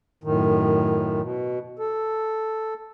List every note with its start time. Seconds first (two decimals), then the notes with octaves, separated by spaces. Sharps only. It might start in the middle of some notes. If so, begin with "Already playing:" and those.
0.24 F#2 A2 D#3
1.21 B2
1.79 A4